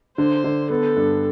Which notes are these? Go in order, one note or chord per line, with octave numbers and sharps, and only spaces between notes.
D3 C5
D3
B3 A4
G2